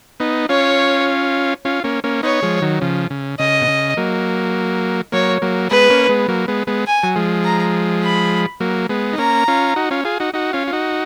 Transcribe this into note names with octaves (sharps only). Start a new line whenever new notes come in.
B3 D#4
C#4 F4 C#5
C#4 F4
A#3 C#4
A#3 C#4
B3 D#4 C#5
F3 G#3
D#3 F#3
C#3 F3
C#3
C#3 D#5
B2
C#3
F#3 A#3
F#3 A#3 C#5
F#3 A#3
G#3 B3 B4
A#3 C#4
G#3 B3
F#3 A#3
G#3 B3
G#3 B3
G#5
F#3
F3 G#3
A#5
B5
F#3 A#3
G#3 B3
D#4
A#3 C#4 A#5
C#4 F4
D#4 F#4
C#4 F4
F4 G#4
D#4 F#4
D#4 F#4
C#4 F4
F4
D#4 F#4